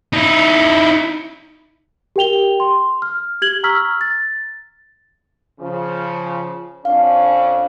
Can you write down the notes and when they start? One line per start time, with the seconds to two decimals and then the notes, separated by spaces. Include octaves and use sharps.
0.13 D#4 E4
2.16 G4 A#4 G5 F7 G7
2.60 C6
3.02 F6
3.42 G4 G#6 F#7 G7
3.63 A#5 C#6 E6 F6 B6
4.01 A6
5.60 C#3 F3
6.85 F2 C#4 D4 F5